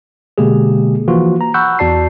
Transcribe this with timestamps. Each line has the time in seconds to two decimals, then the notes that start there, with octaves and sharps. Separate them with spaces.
0.38 B2 D3 G#3 A#3 G4 G#4
1.08 E3 F3 A#3 F4 F#4
1.41 A#5
1.54 F#5 B5 C#6 E6 F#6 G6
1.79 E2 F#4 D5 A5 C7